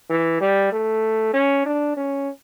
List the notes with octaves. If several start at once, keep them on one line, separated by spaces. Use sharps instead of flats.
E3
G3
A3
C#4
D4
C#4